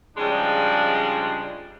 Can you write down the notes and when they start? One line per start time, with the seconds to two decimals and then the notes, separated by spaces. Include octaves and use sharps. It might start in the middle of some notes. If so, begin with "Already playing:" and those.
0.17 C#3 F3 G3 G#3 D4 D#4